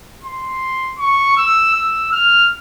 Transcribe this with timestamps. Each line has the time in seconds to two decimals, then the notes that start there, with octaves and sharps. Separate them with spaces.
0.23 C6
0.99 C#6
1.37 E6
1.74 E6
2.12 F6